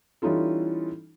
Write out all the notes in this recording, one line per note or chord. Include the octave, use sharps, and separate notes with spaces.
E3 G3 C#4 D#4 F4 A4